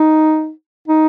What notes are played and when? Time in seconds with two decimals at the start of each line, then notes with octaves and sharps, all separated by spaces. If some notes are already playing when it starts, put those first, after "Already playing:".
Already playing: D#4
0.88 D#4